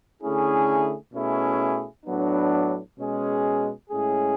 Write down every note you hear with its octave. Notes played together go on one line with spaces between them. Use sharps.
D3 A3 C#4 E4 G#4
B2 A3 C#4 E4 G#4
A2 F#3 B3 D4
B2 G#3 C#4 G#4
A2 G#3 C#4 G#4